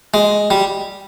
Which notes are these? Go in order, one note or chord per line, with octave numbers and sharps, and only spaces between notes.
G#3
G3